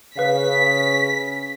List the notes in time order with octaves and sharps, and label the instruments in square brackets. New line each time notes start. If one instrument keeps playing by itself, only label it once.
[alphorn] C#3 [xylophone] B4 F5 [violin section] B6